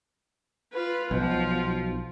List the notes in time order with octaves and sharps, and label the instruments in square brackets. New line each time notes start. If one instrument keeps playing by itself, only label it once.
[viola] F4 B4
[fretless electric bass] B1 [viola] F3 F4